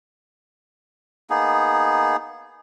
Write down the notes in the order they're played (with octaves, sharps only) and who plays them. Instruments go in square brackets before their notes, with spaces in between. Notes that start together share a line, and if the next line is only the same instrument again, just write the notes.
[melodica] A#3 B3 D#4 G#4